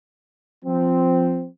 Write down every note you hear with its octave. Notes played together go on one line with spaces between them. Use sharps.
F3 C4